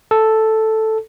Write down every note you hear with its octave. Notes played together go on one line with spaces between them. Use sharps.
A4